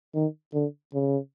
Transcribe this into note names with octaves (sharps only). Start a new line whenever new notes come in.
D#3
D3
C#3